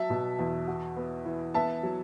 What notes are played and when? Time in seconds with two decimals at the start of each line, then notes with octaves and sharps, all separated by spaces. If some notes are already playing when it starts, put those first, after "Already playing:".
Already playing: F#3 E5 A5
0.10 B2
0.39 E2
0.68 F#4
0.97 B3
1.25 E3
1.54 B3 E5 A5
1.83 F#3